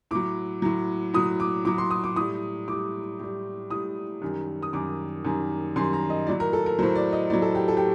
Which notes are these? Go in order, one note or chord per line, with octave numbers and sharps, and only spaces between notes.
A2 F#3 D6
A2 F#3
A2 F#3 D#6
D6
A2 F#3 D6
C6
D#6
D6
A2 G3 D#6
A2 G3 D6
A2 G3
A2 G3 D#6
F#2 D#3 G3
D#6
F#2 D#3 G3 D6
F#2 D#3 G3
F#2 D#3 G3 C6
A#5
D#5
A2 F#3 D5
A#4
A4
A#4
A2 F#3 C5
D5
D#5
A2 F#3 D5
A4
G4
A4
G4